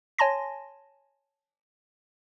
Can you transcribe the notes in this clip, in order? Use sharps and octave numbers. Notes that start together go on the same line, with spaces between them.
C#5 G#5 A5 C6 A#6